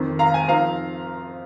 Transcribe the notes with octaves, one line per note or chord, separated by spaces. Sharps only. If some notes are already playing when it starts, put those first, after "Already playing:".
Already playing: F2 D#3 C4 D#4
F5 A#5
G#5
F2 F3 C4 D#4 F5 A#5